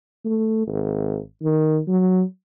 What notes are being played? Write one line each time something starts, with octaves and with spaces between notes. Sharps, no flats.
A3
G#1
D#3
F#3